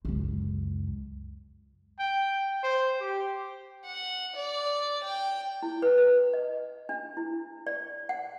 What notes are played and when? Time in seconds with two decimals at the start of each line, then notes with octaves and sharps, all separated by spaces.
0.05 C#2 F#2
1.99 G5
2.63 C5
3.00 G4
3.86 F#5
4.36 D5
5.04 G5
5.63 E4
5.82 B4
5.98 B4
6.33 D#5
6.89 D4
7.17 E4
7.67 D5
8.09 F#5